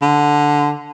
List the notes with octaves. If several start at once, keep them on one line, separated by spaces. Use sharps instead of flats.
D3